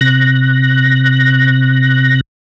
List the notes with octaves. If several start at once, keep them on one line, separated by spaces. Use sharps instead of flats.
C3 F#6 A#6